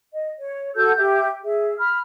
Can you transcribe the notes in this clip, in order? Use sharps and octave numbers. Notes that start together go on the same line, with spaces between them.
D#5
C#5
F#4 A4 E6 G6
G4 E5 G6
G#4 E5
B5 F6